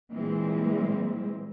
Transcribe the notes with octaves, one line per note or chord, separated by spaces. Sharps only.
A#2 E3 G3 G#3 C4